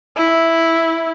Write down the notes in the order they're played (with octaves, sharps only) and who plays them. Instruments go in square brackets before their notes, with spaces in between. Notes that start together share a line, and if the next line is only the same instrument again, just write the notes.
[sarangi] E4